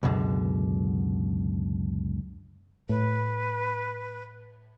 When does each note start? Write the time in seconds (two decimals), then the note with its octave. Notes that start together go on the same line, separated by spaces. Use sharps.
0.03 C#2 F#2 B2 D3
2.89 A2 B4